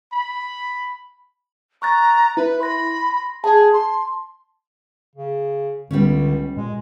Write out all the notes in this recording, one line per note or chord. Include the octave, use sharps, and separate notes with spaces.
B5
A#5 C#6 F#6 A6
E4 B4
B5 C6 A#6
G#4 A5
C6
C#3
C#2 D3 G3 B3 C#4
A#2 G#3